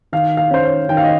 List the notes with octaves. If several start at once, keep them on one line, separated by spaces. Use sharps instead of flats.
D#3 F5
F5
C#4 C5
C#5
D#3 G5
F5
D#5